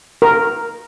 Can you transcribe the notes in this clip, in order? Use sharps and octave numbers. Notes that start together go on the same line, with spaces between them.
A#4